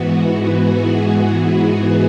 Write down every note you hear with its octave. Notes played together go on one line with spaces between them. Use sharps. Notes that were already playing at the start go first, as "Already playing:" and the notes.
Already playing: G#2 E3 B3 F#4
G#4
F#4